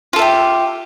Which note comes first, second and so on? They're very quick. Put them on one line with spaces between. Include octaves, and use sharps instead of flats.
F4 A4 E5 G4